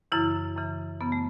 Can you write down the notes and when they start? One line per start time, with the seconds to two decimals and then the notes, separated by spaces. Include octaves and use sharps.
0.12 F#2 C#3 E3 E4
0.57 F#2 C#3 E3
1.01 F#2 C#3 E3 B3
1.12 A3